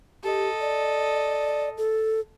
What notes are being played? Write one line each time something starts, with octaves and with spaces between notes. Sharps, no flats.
G4 A4 D#5
D5
A4